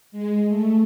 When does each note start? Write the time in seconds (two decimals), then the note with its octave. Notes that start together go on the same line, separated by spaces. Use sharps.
0.12 G#3
0.48 A3